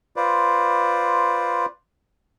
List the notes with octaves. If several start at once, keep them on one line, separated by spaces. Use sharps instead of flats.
F4 B4 C5 D5